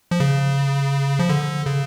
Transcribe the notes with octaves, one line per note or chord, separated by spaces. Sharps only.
F3
C#3
F3
D3
C#3